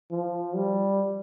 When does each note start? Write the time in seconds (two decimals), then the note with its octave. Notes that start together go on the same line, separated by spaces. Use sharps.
0.12 F3
0.55 G3